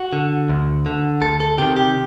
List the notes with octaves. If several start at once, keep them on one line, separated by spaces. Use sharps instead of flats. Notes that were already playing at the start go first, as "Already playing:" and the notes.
Already playing: F#4
D3
D2
D3
D2 A4
A4
C3 D#3 G4
G4